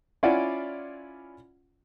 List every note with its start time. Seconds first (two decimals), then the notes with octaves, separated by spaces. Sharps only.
0.23 C#4 E4 F4 D5 F#5